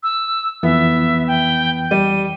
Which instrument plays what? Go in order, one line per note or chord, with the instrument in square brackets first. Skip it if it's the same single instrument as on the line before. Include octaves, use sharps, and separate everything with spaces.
[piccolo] E6
[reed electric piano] F2 E3 [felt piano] B3 [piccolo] E5
[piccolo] G5
[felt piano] G3 [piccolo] D#7